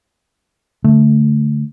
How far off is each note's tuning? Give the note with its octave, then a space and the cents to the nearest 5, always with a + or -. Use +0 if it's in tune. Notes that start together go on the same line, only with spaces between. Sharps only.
D3 -30 A3 +0